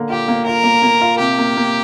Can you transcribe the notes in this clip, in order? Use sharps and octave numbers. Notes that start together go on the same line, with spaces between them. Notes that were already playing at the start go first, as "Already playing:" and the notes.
Already playing: D3 A#3
F4 G4
A#3
F4 A#4
A#3
A#3
F4
C3 G4
A#3
A#3